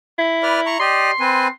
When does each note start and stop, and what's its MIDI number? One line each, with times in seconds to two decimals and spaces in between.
0.19 0.76 64
0.43 0.60 71
0.43 0.60 74
0.43 0.60 89
0.66 0.78 82
0.66 0.78 85
0.80 1.11 67
0.80 1.11 74
0.80 1.11 75
0.80 1.51 84
1.20 1.48 60
1.20 1.48 71
1.20 1.48 80